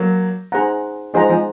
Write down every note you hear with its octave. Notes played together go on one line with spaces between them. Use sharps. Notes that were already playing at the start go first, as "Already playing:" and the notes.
Already playing: F#3 A#3
D#4 G#4 C5 F#5 A#5
F3 G#3 D#4 G#4 C5 F#5 A#5
F3 G#3